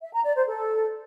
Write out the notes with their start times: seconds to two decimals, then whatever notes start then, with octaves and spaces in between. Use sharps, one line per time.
0.01 E5
0.13 A#5
0.24 D5
0.36 C5
0.47 A4